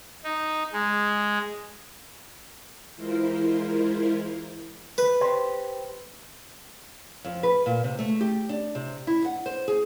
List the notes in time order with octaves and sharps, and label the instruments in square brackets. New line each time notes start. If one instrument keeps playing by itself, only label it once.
[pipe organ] D#4
G#3
[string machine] E3 G#3 E4 F4 A#4 C5
[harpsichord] B4
[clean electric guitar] G4 C5
[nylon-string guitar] F2
B4
A#2
C3
A3
G4
D4
C3
E4
F#5
C5
G#4